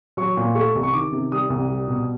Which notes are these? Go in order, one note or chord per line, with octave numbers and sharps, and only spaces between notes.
F#3 C#6
A#2
A3 C#6
C2
C#6
D#3 D6
C3
G3 D#6
C2
G3
B2